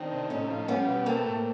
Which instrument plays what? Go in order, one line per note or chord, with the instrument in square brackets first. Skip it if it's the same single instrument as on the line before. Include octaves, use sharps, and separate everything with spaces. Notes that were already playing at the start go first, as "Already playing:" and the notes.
Already playing: [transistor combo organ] D#3 [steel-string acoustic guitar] C4 D4
[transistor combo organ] C3
[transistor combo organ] A2 [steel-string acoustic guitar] C#4 D#4
[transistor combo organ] F3
[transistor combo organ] G3 [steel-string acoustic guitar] B3 C#4
[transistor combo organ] B2
[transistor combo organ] A3 [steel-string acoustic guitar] A#3 C4
[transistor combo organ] A2